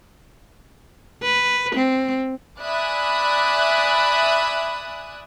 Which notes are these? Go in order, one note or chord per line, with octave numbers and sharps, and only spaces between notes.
B4
C4
D5 E5 G#5 B5 D#6 F#6